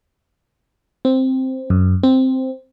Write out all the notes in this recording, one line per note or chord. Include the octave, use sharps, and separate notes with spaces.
C4
F#2
C4